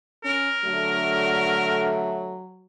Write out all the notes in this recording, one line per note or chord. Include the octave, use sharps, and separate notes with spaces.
C#4 A#4
D3 F#3 A3